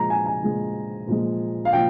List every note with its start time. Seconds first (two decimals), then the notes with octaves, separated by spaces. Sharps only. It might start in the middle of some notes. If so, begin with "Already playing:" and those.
Already playing: A#2 F3 G#3 A#5
0.10 G#5
0.26 G#5
0.43 A#2 F3 G#3
1.07 A#2 F3 G#3
1.65 F5
1.73 A#2 F3 G5